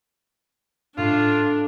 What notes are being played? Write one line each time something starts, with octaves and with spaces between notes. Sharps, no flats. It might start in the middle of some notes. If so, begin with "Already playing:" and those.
A2 D4 F4